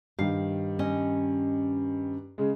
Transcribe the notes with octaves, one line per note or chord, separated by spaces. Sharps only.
G2 D#3 F5
C#4 D#5
C#3 G#3